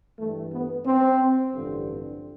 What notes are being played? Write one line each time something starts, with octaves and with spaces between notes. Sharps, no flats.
G2 E3 G3 A3
B3
C4
A1 G2 D3 F3